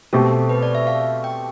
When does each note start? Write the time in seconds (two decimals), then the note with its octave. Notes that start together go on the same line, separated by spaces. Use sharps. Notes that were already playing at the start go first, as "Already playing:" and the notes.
0.13 B2 A3 C4 G4 A4
0.49 B4
0.63 D5
0.75 E5
0.87 F5
1.24 G5